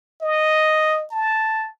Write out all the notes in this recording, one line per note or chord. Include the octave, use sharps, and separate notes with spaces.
D#5
A5